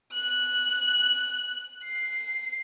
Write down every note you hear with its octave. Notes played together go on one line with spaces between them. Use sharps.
F#6
C7